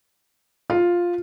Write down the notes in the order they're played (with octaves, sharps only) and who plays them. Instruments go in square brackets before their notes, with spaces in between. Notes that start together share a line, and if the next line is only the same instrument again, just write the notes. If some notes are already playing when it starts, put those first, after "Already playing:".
[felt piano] F4